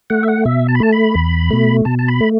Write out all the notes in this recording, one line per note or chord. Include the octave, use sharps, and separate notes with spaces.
A3 F#5
E5
F#5
B2 E5
A5
B5
A3 A5
B5
E2
B2 A3
B2 A5
A5
B5
A3